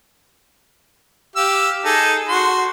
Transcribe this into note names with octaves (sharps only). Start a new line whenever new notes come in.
G4 F5 E6
D#4 G#4 A4
F#4 C6